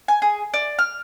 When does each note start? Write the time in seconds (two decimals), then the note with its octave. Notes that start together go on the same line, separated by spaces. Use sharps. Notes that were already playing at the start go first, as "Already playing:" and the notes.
0.08 G#5
0.22 G#4
0.54 D5
0.79 F6